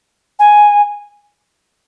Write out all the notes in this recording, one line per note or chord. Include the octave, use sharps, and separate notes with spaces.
G#5